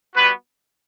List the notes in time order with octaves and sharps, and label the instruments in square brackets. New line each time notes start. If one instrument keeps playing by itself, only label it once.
[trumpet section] G3 B3 F#4 B4